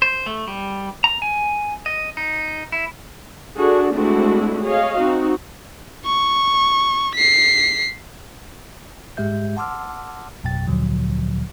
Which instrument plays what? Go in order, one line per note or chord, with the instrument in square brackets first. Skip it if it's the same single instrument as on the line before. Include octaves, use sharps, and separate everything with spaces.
[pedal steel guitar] C5
A3
G3
A#5
G#5
D#5
D#4
E4
[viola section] D4 F#4 G#4 A4
G#3 A3 C4 D4 E4 F#4
G#4 C#5 D#5 F5
C4 D#4 F#4
[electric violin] C#6
B6 C7
[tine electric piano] G#2 G#3 G4 E5 G6
F#5 A5 C6 D6 E6 F6
A1 F2 B2 F#3 G5 A6
D2 A#2 D3 F3 F#3